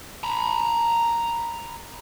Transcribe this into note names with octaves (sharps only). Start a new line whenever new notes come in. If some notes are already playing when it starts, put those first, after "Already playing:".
A#5 B5